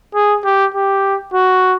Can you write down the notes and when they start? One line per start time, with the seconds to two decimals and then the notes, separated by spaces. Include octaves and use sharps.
0.15 G#4
0.45 G4
0.74 G4
1.34 F#4